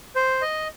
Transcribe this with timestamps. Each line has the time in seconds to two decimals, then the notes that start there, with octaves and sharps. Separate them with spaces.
0.16 C5
0.42 D#5